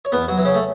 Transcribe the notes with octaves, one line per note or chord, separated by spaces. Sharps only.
C#5
E2 B3 B4
F#3 F#4
E3
C#3 C#4
A3